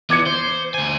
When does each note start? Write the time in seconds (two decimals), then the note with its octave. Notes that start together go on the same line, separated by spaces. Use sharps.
0.10 E3 B3 D6 G#6 C#7
0.26 C5
0.74 D2 G#5